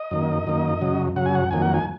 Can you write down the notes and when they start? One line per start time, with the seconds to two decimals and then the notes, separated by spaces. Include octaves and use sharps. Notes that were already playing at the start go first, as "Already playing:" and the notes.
Already playing: D#5
0.11 F#2 D#3 A#3
0.47 F#2 D#3 A#3
0.81 F#2 C#3 F#3
1.16 F#2 C#3 F#3 F#5
1.26 G#5
1.35 F#5
1.51 F2 D#3 F#3 A#3 G#5
1.62 F#5
1.74 G#5